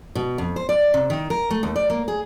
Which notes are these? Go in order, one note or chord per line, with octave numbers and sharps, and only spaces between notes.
B2
F2
C5
D5
C3
D#3
A#4
A3
D#2
D5
A#3
G#4